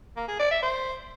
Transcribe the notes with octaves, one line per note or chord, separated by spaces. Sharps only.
A#3
G#4
D5
E5
C5